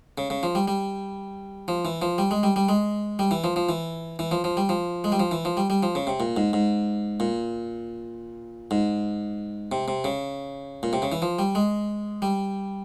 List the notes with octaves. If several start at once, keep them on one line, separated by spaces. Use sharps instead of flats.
C#3
C#3
F3
G3
G3
F3
E3
F3
G3
G#3
G3
G3
G#3
G3
E3
F3
F3
E3
E3
F3
F3
G3
F3
G#3
G3
F3
E3
F3
G3
G3
F3
C#3
C3
A#2
G#2
G#2
A#2
G#2
C3
C3
C#3
A#2
C3
C#3
E3
F3
G3
G#3
G3